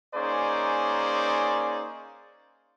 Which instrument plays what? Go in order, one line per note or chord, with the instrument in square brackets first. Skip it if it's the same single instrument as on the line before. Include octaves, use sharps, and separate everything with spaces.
[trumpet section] A#3 C#4 D#4 G#4 C5 D5